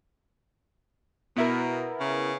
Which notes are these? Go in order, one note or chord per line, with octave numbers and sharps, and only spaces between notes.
B2 B3 E4 A#4
C#3